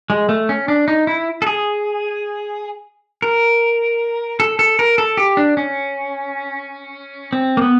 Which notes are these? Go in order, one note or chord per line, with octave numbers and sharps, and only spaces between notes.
G#3
A3
C#4
D4
D#4
E4
A4
G#4
A#4
A4
A4
A#4
A4
G4
D4
C#4
C4
A#3
B3